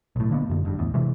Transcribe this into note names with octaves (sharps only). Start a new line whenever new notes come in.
B1 A2
D3 A#3 B3
F#2 D3
F#1 G2
A1 E2
C3 E3 G#3